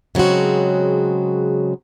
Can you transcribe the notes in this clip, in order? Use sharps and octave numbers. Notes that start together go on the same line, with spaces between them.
C#3 F#3 G#3 C4 F#4